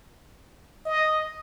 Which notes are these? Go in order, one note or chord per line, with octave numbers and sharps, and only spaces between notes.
D#5